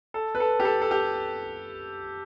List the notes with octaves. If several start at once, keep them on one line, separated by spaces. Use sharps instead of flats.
A4
B4
A4
G4
A4
A4
G4